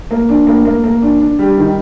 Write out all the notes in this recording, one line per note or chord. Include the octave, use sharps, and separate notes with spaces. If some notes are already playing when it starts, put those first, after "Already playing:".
A#3
D4
A#3
A#3
A#3
D4
D4
G3
D#3